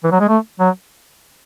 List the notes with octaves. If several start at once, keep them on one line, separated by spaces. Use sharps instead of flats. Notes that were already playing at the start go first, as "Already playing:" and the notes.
E3
F#3
G#3
A3
F#3